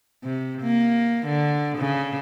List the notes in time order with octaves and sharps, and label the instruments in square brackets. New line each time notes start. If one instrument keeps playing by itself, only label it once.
[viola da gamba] C3
A#3
D3
C#3